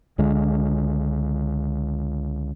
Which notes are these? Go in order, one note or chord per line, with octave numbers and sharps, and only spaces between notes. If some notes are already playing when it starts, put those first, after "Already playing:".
C#2 D3 G#3